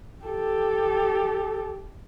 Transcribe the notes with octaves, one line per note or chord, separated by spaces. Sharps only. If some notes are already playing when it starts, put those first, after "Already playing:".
G4 A4